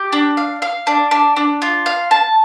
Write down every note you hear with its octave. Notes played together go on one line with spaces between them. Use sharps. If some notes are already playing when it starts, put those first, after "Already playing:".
Already playing: G4
D4
F5
F5
D4
D4
D4
F4
F5
A5